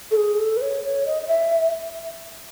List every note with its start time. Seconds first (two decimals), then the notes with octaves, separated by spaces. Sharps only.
0.11 A4
0.17 G#4
0.39 A4
0.57 B4
0.61 C#5
0.84 C#5
1.06 D#5
1.22 D#5
1.27 E5